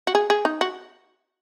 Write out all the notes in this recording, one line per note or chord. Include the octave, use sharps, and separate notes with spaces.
F#4
G#4
G#4
D#4
F#4